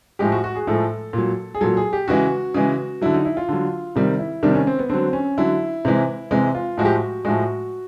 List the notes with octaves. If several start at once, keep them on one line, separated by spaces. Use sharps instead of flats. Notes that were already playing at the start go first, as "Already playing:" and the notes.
A2 F3 G#3 G4
F#4
F#4
G#4
A2 F3 G#3 A4
A#2 F#3
G#4
A#2 F#3 A4
G#4
G4
C#3 E3 G#3 F#4
C#3 E3 G#3
D3 F#3 E4
D#4
E4
F4
D3 F#3
C3 D#3 G3
E4
C3 D#3 G3 D4
C#4
C4
B3
D3 F#3 C4
C#4
D3 F#3 E4
C3 E3 G#3
C3 E3 G#3
F4
A2 F3 G#3 F#4
G4
F#4
A2 F3 G#3 F#4